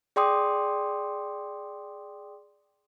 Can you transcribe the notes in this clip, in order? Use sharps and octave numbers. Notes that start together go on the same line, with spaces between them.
G#4 D5 G5 C6 D6 D#6